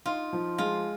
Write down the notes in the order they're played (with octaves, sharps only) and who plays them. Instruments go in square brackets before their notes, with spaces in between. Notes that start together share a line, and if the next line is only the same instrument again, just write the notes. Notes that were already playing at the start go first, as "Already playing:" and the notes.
[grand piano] D#4 [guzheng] F4
[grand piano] F3
[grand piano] G#3 [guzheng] F4